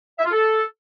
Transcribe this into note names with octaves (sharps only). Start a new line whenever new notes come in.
E5
F4
A4